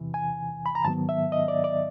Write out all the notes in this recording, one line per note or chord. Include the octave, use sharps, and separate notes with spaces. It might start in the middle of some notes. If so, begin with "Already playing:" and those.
Already playing: E2 C3 E3
G#5
B5
A#5
G#2 D#3 F#3 B3 A5
E5
D#5
D5
D5